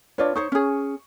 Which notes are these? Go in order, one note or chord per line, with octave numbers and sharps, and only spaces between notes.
D4 F4 B4 C#5 D5
D#4 C5 C#5 C#6
C#4 G#4